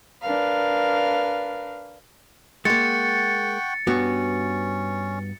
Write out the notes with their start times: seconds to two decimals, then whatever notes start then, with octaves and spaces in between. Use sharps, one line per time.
0.22 D4 A#4 B4 F5
2.65 G#3 A#3 F#5 G5 C#6 A6 C#7
3.87 G2 B3 C#4 F#4